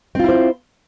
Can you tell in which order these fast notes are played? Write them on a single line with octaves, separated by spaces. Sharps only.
C4 F4 E4 C5